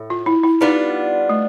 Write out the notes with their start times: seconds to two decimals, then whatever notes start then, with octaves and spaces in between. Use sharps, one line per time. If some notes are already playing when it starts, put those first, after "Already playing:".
Already playing: A2
0.10 F4
0.26 E4
0.44 E4
0.61 G3 B3 D4 D#4 F4
1.29 A3